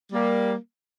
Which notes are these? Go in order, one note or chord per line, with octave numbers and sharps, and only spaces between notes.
G3 A#3